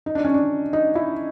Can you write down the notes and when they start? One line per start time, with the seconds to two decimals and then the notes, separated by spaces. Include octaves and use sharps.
0.06 D#4
0.15 D4
0.24 C#4
0.34 D4
0.73 D#4
0.95 E4